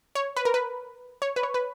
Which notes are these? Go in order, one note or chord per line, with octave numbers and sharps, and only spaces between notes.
C#5
B4
A#4
B4
C#5
B4
C#5
B4